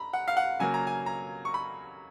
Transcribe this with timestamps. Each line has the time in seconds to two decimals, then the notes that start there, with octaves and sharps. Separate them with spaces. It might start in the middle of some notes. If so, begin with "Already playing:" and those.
Already playing: A#5 B5
0.13 F#5
0.28 F5
0.37 F#5
0.59 C#3 F#3 A#3 G#5
0.74 A#5
0.87 G#5
1.06 A#5
1.45 C#6
1.54 B5